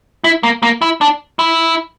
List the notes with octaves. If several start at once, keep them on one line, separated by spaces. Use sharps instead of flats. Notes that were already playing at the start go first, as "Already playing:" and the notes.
E4
A#3
A#3
E4
D4
E4